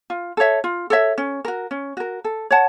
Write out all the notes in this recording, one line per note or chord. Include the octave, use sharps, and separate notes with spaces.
F4
A4 C#5 E5
F4
A4 C#5 E5
C#4
F#4 A#4
C#4
F#4 A#4
A4
C#5 F#5 A5